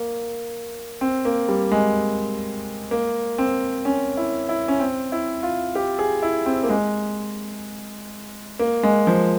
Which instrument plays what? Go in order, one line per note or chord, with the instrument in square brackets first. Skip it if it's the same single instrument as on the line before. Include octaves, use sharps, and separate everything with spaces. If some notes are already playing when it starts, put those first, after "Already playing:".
Already playing: [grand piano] A#3
C4
A#3
G3
G#3
A#3
C4
C#4
E4
E4
C#4
C4
E4
F4
G4
G#4
E4
C4
A#3
G#3
A#3
G#3
F3